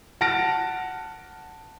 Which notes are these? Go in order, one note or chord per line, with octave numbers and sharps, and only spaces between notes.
F#5 A5 F6 A#6 D7